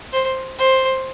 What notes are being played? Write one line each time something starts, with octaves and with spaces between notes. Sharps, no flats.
C5
C5